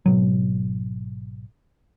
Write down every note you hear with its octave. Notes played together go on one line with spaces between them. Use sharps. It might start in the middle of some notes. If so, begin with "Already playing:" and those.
G#1 B2 F#3